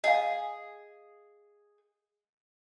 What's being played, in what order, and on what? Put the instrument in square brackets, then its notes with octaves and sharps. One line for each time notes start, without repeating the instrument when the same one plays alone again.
[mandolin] G#4 [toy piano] D#5 F5